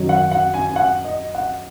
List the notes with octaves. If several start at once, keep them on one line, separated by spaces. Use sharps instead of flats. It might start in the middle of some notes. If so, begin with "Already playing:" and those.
Already playing: F#2 D#3 F#3
F#5
F#5
G#5
G#5
F#5
D#5
F#5